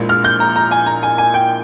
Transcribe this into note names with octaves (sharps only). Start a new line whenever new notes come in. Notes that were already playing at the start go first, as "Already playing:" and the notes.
Already playing: A#1 A#2 G#3 E4
F6
G6
A#5
A#5
G#5
A#5
G#5
G#5
G5